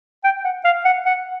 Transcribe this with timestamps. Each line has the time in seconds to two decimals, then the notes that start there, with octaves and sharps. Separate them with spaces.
0.24 G5
0.44 F#5
0.64 F5
0.85 F#5
1.05 F#5